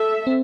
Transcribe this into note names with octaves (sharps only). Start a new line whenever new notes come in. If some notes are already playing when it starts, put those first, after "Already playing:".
Already playing: A4 E5
C4